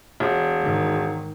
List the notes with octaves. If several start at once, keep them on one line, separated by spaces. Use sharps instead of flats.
E1
G#2 D#3